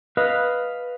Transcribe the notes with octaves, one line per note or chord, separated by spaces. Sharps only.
B4 D#5 F5